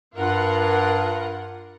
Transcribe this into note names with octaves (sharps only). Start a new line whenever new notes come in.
G2 F4 A#4 F#5